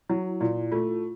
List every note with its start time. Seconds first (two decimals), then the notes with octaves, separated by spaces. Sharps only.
0.09 F#3 E4
0.40 A#2 E4
0.71 A3 F4